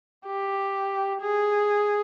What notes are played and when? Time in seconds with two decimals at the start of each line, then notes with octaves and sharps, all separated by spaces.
0.26 G4
1.22 G#4